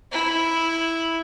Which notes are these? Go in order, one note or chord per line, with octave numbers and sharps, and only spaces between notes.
E4